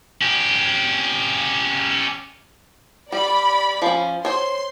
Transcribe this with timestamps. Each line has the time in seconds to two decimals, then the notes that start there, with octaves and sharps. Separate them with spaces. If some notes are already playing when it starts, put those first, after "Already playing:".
0.22 C#4 G4
3.12 G3 D5 B5
3.82 F3 C#4
4.25 C5 C#5 C6